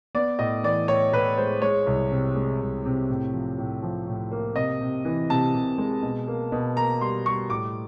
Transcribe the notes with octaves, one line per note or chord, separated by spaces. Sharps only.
B3 D5
A2 D#5
E3 D5
A2 C#5
A2 B4
G#3 C5
G#3 C#5
C2
C3
G#3
C2
C3
A2
F3
A2
F3
A2
A#3
C3 D#5
C3
E3
C3 A5
C3
G#3
B2
A#3
B2
A#3 A#5
G3 C6
G3 C#6
A2 D6